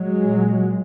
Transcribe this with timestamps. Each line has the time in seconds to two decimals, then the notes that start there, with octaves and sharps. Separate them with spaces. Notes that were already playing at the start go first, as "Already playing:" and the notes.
Already playing: F#3 G#3
0.24 A#2